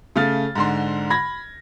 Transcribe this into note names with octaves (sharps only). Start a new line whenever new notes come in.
C#3 A3 F5 F6 A6
G#2 D3 C6
B5 G#6 A#6